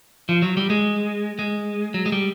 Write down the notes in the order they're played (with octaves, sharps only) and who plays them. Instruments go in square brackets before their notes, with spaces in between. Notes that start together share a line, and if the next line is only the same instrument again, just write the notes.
[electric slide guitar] F3
F#3
G3
G#3
G#3
F#3
G#3
G3